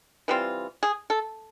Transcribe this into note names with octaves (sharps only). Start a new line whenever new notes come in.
E3 G3 C4 F4
G#4
A4